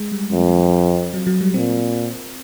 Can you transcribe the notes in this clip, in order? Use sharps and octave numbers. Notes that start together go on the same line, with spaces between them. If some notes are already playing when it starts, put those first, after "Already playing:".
Already playing: G#3
G3
F2
F#3
F#3
G3
A#2 C4